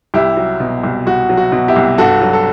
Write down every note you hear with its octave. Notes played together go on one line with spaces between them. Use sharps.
C2 E4 G4
F#3
B2
C2
C2 F#4
F#3
F#4
B2
E4 G4
C2
G2 F#4 A4
F#3
A4